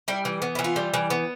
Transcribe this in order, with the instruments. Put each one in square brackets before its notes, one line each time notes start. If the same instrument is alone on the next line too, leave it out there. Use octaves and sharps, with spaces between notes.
[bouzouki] G3 E4
E3
B3
E3 E4
F4
G3
E3
B3